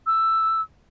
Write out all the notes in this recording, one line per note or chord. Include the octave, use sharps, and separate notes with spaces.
E6